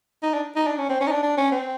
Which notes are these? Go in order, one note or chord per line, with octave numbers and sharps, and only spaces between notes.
D#4
D4
D#4
D4
C#4
C4
C#4
D#4
D4
D4
C#4
C4